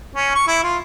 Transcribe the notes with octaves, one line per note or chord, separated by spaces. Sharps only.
C#4
C#6
E4
F4